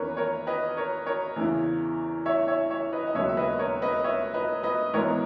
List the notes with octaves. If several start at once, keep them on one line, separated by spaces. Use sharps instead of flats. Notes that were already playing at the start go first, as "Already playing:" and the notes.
Already playing: E2 D#3 A#3 C#4 A#4 B4 C#5
A#4 C#5
B4 D#5
A#4 C#5
A#4 C#5
E2 C#3 E3
C#5 E5
C#5 E5
C#5 E5
B4 D#5
D#5
E1 D#2 C#3 F#3 C#5 E5
E5
B4 D#5
A#4 C#5
B4 D#5
C#5 E5
B4 D#5
B4 D#5
G#1 G#2 E3 B3 D#4 A#4 C#5